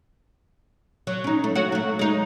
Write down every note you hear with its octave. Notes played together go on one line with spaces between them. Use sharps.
F#3
C#4 D#4
A3
C#4 F#4
F#3 A3
G#3 D#4